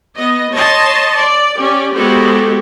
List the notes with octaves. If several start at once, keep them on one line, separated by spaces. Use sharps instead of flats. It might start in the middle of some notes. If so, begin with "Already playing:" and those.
B3 D#5
C#5 D#5 A5 C6
D5
C#4 G4 D5
G#3 B3 F#4 G4 A4 C5